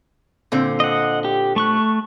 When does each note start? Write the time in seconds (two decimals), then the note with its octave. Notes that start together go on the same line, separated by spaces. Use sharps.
0.52 A#2 D3 C4
0.80 D#5 F#5
1.25 G4
1.56 A3 C#6 F#6